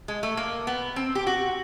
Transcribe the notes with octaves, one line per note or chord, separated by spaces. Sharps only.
G#3
A3
A#3
B3
C4
G4
F#4